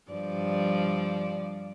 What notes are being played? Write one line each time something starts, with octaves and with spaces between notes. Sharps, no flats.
G2 F3 D5